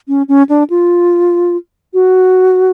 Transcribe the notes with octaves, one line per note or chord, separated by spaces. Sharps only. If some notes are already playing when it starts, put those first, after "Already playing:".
C#4
C#4
D4
F4
F#4